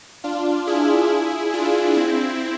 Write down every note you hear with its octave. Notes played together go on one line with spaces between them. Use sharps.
D4 F4
E4 G#4
D4 F4
C4 E4